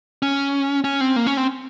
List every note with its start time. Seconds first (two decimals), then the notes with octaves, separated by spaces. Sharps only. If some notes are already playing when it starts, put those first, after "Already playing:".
0.23 C#4
0.84 C#4
1.01 C4
1.16 A#3
1.27 C#4
1.37 C4